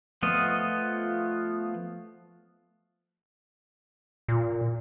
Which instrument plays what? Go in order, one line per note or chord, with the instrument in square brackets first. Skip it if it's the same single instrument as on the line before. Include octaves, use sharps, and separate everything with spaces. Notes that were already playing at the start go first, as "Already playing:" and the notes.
[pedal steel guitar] F3 A3 B3 F4 D#5
[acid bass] A#2